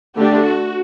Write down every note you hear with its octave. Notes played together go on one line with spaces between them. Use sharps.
D3 A3 D4 G4
F#4